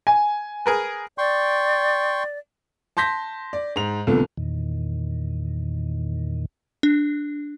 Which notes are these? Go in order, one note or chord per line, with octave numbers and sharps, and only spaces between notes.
G#5
G#4 A#4 B4
D5 G5 C6 C#6
A5 C6 G6 A#6 B6
D5
G#2 F7
C2 F2 A#2 D3 A3 B3
E2 A#2 D#3
D4